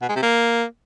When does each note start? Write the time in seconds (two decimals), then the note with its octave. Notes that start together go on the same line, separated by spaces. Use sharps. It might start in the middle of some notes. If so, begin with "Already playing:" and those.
0.02 B2
0.09 G#3
0.16 C3
0.23 A#3